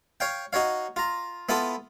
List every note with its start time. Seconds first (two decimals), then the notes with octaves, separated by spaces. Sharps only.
0.20 C#5 F5 G5
0.53 D#4 F#4 C#5 F5
0.96 F4 A#5
1.49 B3 E4 F4 A4 D#6